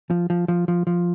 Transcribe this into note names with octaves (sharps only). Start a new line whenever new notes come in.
F3
F3
F3
F3
F3